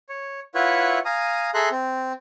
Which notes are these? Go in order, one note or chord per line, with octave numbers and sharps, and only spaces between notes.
C#5
E4 F4 B4 C#5 E5 F#5
F5 G#5 A#5 D#6
G#4 A4 E5 A#5 C6 F#6
C4